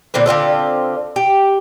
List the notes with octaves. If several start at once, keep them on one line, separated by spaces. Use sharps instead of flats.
A#2 D3 C4 B4
D3 C4 F4 A4
G4